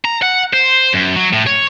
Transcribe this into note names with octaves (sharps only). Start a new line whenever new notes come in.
A#5
F#5
C5
F#2
F#3
A2
C#5